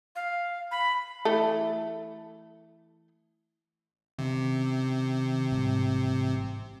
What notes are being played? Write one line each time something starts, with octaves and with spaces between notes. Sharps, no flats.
F5
B5
E3 A3 A4
C3 D#3 C4 C#4
A1 G#2 G3